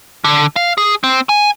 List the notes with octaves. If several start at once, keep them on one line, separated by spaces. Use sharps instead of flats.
D3
F5
G#4
C4
G#5